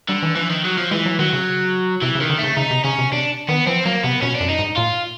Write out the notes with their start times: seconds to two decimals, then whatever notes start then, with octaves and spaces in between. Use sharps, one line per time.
0.09 D3 G3
0.23 E3
0.36 E3 F3
0.50 D#3
0.65 F#3
0.78 F3
0.91 E3 G#3
1.06 F#3
1.19 D#3 F#3
1.33 C#3
2.02 C3 E3
2.15 C#3
2.21 D#3
2.30 D3
2.38 C#3 A3
2.56 C#3 D#4
2.71 C3
2.84 C#3 C#4
2.98 C3
3.12 C3 D4
3.48 D#3 B3
3.67 F3 C4
3.86 F#3 A#3
4.04 C3 B3
4.22 B2 C#4
4.35 D4
4.40 F#2
4.50 D#4
4.59 G#2
4.77 A#2 F4